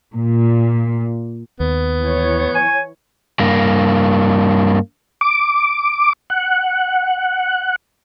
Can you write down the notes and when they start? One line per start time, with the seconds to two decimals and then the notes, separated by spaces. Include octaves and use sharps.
0.13 A#2
1.60 D#2 B3
2.01 E3 C#5
2.55 G#5
3.40 G2 A#3
5.21 D6
6.30 F#5